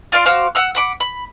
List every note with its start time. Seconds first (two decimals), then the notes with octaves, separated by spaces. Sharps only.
0.12 F4 D5 F5 C6
0.25 F#4 C5 F5 D6
0.55 F#5 E6 F6
0.75 F#5 B5 D6
1.00 B5